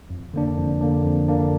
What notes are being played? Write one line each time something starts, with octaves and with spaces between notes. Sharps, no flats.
F2
D3 A#3 D4
F2
D3 A#3 D4
F2
D3 A#3 D4